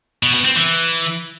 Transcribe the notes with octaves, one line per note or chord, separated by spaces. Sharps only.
B2
B2
C4
E3